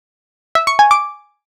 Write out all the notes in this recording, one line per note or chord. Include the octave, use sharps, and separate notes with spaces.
E5
C#6
G#5
D6